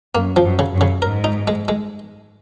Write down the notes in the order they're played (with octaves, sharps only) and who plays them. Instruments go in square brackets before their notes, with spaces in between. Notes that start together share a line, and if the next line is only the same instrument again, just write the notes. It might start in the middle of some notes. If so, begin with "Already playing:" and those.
[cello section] F#2 [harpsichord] A#3
[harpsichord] F3
[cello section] F#2
[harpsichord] C#3
[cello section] F#2
[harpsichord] C#3
[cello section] G#2 [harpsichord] A#4
[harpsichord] D#4
G#3
G#3